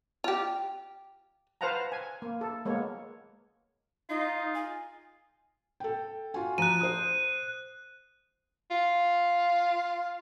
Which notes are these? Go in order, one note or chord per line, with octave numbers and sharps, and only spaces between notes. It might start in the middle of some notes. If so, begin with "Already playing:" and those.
F4 G4
B4 C5 F5 F#5 A5 A#5
G#5
A#3
A4
G#3 A#3 B3 C#5
D#4 F4
G#5
A4 G5
F4 F#4 G#5
F3 A#5 F#6 D#7
C5 D#6
F4